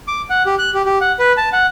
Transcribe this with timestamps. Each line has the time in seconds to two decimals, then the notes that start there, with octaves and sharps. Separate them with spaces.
0.08 D6
0.30 F#5
0.46 G4
0.59 F#6
0.74 G4
0.86 G4
1.01 F#5
1.19 B4
1.37 A5
1.53 F#5